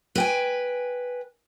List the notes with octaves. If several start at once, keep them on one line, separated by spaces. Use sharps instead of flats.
B4 G5 G#5